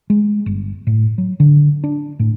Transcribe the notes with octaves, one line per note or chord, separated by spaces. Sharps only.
G#3
G1
A2
F#3
D3
D4
A2